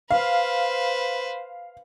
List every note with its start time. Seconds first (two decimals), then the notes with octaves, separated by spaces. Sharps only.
0.11 B4 C5 F5